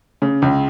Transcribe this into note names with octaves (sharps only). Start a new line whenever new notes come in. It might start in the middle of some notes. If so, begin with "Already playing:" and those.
C#3
C#2